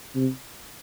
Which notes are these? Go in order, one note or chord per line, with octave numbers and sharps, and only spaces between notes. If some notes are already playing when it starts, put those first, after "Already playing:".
C3